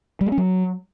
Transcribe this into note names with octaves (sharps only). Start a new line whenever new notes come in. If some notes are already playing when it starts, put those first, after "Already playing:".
G3
A3
C#4
F#3